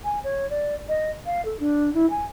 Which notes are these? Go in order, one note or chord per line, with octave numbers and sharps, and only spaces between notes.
G#5
C#5
D5
D#5
F5
A4
D4
E4
G#5